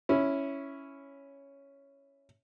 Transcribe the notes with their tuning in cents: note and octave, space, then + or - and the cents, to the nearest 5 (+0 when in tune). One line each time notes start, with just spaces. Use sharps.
C#4 +0 E4 +0